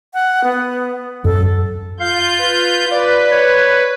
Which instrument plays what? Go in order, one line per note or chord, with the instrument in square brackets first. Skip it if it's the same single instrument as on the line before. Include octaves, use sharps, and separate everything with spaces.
[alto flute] F#5
B3
[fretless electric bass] F#2 F#3 [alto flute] A4
[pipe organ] F4 G6 [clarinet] F5
[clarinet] B4
[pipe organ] B4 [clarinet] D5
[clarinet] C#5